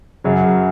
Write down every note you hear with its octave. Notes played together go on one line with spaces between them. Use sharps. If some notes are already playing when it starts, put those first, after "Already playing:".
F#2 C#3 F#3